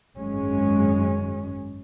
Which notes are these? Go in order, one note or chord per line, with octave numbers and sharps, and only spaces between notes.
G#1 F#2 G#3 C#4